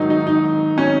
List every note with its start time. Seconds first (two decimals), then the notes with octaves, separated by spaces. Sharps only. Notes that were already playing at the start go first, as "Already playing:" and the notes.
Already playing: G#2 D#3 F#3 D#4
0.10 D#4
0.27 D#4
0.78 C#4